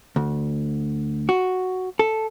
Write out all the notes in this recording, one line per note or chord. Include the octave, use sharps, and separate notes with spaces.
D2
F#4
A4